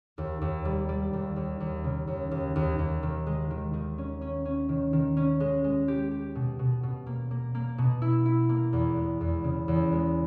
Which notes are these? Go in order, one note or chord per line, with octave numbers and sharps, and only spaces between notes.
D#2
D#2
G3
G3
D#2
D#2
D#2
C#3
D#2
D#2
D#2
D#2
D#3
G#3
D#3
D#3
C#4
C#4
C#4
D#3
D#3
C#4
G#3
G#3
G4
G4
B2
B2
B2
A#3
A#3
A#3
B2
E4
E4
A#3
E2
G#3
E2
C#3
E2
G#3